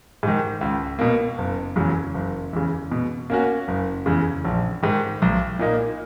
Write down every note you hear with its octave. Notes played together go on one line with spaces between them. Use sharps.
G#2 D#3
C#2
B2 A#3
F#1
E2 C#3 F#3
F#1
E2 C#3
B2
A#3 C#4 F#4
F#1
E2 C#3
A#1
G#2 D#3
B1
A#2 A#3 D#4